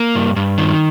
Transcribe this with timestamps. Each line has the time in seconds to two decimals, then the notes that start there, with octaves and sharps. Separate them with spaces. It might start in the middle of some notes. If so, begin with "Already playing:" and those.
Already playing: A#3
0.15 G2
0.36 G2
0.58 D#3